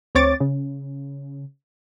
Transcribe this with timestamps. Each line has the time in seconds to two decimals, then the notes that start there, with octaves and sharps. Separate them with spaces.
0.15 D2 C4 C#5 D6 A6
0.40 C#3